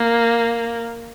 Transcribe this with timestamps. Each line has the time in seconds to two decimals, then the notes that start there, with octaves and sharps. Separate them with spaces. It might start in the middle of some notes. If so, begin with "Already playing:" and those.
Already playing: A#3